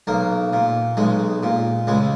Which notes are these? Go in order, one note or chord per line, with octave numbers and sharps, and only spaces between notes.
B1 A#3
A#2
B1 G#3
A#2
C#2 G#3